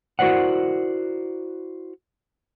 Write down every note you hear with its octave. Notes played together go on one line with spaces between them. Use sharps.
E4 F#4 A#4 C5 D5 F#5